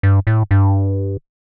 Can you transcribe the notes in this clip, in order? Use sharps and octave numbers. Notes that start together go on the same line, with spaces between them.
G2
A2
G2